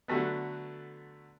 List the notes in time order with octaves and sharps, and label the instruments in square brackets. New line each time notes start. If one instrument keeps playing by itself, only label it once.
[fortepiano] D3 F#3 A3 B3